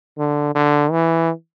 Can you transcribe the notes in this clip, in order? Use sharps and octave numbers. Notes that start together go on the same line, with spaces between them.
D3
D3
E3